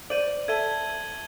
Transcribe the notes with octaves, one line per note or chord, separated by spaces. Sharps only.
C5 D5 D#7 F#7
A4 E5 A5 G#6 D#7 G7